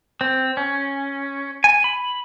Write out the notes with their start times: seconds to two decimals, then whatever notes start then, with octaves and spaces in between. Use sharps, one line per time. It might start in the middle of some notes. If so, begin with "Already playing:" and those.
0.21 C4
0.57 C#4
1.64 G#5
1.84 B5